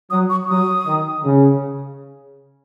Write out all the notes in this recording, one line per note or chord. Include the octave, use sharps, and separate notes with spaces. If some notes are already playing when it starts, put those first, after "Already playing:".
F#3 D#6
C#6
F#3 D#6
D#3
C#3